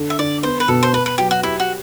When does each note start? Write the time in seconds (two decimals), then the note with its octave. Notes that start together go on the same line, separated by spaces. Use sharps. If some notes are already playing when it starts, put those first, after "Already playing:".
Already playing: D3 A4
0.10 E5
0.19 D3 D5
0.43 B3 C5
0.60 B4
0.68 B2 A4
0.83 C5
0.93 B3 B4
1.06 B4
1.18 F#3 G4
1.31 F#4
1.43 E4 G4
1.60 F#4